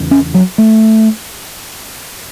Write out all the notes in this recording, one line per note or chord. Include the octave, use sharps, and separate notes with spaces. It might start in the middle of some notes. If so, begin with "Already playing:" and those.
Already playing: E2 C#3
C#4
F#3
A3